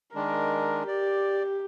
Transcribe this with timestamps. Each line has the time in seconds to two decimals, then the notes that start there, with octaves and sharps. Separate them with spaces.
0.15 D#3 G#3 D4 A#4
0.87 G4 D5